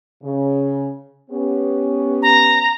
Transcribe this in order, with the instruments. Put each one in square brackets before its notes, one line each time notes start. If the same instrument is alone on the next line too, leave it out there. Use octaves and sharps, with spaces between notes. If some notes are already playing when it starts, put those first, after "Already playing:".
[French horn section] C#3
B3 C#4 G4
[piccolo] A#5